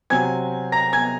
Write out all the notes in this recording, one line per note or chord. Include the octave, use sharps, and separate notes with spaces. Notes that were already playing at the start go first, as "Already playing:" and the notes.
C3 F#3 C4 G#5 G#6
A#5 A#6
G#5 G#6